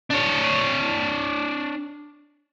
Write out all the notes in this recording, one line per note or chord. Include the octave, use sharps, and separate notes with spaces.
D4 C#5